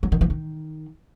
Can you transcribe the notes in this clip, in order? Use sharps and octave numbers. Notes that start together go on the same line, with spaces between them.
F#3
D#3
E3
D#3